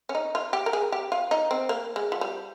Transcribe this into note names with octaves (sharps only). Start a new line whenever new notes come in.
C#4
D#4
F4
G4
A#4
G#4
G4
F4
D#4
C4
A#3
G#3
F3
G3